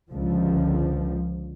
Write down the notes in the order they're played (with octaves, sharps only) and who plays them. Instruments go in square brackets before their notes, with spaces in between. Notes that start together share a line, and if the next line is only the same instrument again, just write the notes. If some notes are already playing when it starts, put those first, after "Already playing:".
[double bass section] C#2 D3 F3